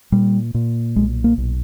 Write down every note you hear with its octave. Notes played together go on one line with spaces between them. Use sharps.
A#2 G3
A#2
B1 G#3
A#3
B1